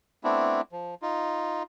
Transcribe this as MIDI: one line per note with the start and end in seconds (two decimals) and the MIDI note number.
0.24 0.61 57
0.24 0.61 59
0.24 0.61 60
0.24 0.61 62
0.24 0.61 64
0.72 0.95 53
1.02 1.63 63
1.02 1.63 65